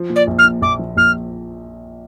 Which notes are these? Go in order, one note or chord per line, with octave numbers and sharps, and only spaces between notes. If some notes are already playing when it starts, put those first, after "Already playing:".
Already playing: F3
A#2
D5
A#1
F6
A#2
A#1 D6
F3
A#1 F6